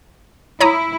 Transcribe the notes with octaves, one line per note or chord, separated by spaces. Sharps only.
E4 C#5 A#5 D#6